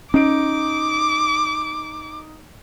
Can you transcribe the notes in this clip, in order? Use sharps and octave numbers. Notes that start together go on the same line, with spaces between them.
C#4 D#4 D6 D7